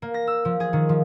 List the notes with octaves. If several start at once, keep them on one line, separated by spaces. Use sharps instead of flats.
A#3
A#6
E6
F3
G#4
D#3
F3